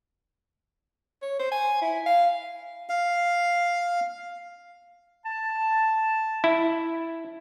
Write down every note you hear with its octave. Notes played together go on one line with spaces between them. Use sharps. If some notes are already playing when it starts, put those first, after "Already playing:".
C#5
C5
G#5
E4
F5
F5
A5
E4